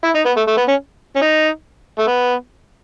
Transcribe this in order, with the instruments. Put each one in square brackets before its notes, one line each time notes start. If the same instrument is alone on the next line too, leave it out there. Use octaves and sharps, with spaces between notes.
[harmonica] E4
D#4
B3
A3
A3
B3
C#4
C#4
D#4
A3
B3